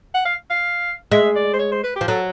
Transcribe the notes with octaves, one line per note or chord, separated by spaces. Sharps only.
F#5
F5
F5
G#3 E5
D5
C5
C#5
C5
B4
G4
F3
F#3 A4